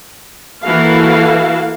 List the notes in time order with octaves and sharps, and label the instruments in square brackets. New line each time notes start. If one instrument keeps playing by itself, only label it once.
[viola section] E3 A#3 E4 F#4 A4 F5